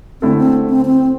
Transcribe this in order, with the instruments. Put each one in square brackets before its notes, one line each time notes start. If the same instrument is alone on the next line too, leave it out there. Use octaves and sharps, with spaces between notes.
[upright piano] D3 A3 E4 A4 [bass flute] C4
[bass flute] C4
C4
C4